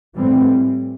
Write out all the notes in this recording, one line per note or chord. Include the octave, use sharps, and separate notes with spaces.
A2 E3 G3 C4